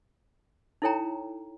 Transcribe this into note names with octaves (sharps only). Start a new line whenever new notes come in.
D#4 E4 A4 C#5 G5 A#5